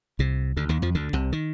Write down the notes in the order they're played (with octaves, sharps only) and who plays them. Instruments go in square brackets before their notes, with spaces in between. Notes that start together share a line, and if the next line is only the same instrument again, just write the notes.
[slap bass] C2 C3
D2 D3
D#2 D#3
F2 F3
D2 D3
C2 C3
D#3